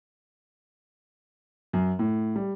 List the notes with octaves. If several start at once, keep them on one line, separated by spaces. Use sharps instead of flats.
F#2
A2
G3